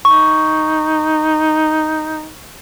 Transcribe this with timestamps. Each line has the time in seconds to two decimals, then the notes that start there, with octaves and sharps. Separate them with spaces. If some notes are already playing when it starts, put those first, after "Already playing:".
0.05 D#4 C#6